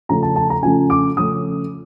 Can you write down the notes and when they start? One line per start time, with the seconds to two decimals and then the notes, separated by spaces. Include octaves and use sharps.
0.09 C#3 F3 A3 C#4 A#5
0.23 A5
0.36 A5
0.50 A#5
0.63 C#3 F3 A3 C#4 G#5
0.90 D6
1.16 C#3 F3 A3 C#4 D#6